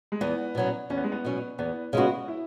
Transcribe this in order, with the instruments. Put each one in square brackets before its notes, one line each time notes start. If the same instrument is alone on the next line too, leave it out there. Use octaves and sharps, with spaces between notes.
[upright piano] G#3
[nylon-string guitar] E2 [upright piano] B3
[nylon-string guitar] B2 F#3 C#4
[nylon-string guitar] E2 [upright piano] C#4
[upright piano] B3
G#3
B3
[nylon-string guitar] B2 F#3 C#4
[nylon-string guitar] E2 [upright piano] B3
[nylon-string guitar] C#3 G#3 B3 F#4
[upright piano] E4